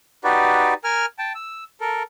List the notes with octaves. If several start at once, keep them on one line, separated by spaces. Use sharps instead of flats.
D#4 F#4 G4 B4 D5
A#4 G#5 F6
G5 A5
E6
A4 A#4